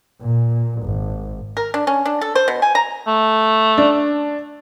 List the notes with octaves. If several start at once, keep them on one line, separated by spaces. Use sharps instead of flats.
A#2
G#1
A#4
D4
C#4
D4
A4
C5
B2
G#5
A#5
A3
D4